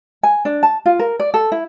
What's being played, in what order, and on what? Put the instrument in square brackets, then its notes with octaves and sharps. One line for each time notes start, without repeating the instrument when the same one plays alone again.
[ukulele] G#5
D4
A5
F4
A#4
D5
A4
E4